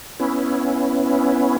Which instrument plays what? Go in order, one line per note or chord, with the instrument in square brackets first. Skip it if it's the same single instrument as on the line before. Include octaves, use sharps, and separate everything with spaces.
[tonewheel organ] B3 C#4 E4